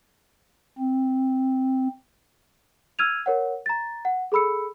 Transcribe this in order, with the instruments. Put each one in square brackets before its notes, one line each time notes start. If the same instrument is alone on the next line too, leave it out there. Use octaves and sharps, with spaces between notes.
[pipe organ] C4
[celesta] E6 F6 G#6 D#7 F7
A#4 C#5 F#5
A#5 A6
F#5
G#4 A4 B5 E6 C#7